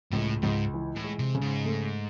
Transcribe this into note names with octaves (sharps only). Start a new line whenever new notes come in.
C#2 A2
C#2 G#2
E3
A2
G#3
C3
C#3
G#2
A3